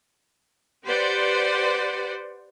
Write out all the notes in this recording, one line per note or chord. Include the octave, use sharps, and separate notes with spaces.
G4 B4 C5 D5 F#5